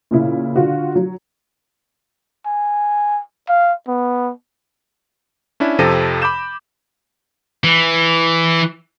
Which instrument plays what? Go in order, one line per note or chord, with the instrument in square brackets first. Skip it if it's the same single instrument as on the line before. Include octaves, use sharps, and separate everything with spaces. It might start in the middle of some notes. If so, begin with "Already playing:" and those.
[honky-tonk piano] A#2 C#3 E4
D3 F4 F#4
F#3
[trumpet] G#5
F5
B3
[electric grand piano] C#4 D4 E4
F2 C3 F3 A4 A#6 D#7
B5 D6 G6 E7
[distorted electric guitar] E3